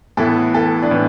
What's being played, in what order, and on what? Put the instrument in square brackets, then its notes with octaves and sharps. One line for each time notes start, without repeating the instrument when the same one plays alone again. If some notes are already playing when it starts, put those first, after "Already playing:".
[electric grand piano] A2 E3 B3 E4 [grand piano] A4
[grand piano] A4
D4
[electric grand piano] A2 E3 [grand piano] B3